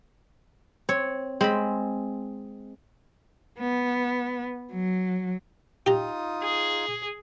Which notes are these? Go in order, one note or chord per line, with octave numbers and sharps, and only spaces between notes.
C4 C#5
G#3 C4 B5
B3
F#3
D#4 F4 G4 A#5 D#6
G#4